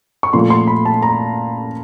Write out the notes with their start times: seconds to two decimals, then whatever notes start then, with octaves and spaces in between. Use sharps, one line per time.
0.23 C#6
0.33 A#2 F3 A3 C6
0.50 C6
0.67 B5
0.85 A5
1.02 A#5